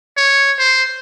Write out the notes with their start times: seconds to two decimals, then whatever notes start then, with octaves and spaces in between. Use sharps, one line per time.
0.17 C#5
0.59 C5